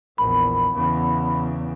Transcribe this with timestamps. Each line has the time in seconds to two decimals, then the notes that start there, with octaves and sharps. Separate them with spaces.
0.18 A#1 E2 B5
0.73 E2 C#3